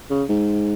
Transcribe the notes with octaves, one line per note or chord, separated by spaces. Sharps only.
C#3
G#2